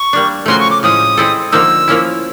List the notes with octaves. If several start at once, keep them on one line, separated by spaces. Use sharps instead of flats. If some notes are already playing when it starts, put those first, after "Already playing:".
Already playing: C#6
G3 A#3 D4
C#3 F3 A3 C#4 F#4 C6
C#6
D6
A2 F3 G#3 C#4 D#6
G#3 C4 E4 A4
D3 F3 A#3 D#4 E6
F3 A#3 C#4 E4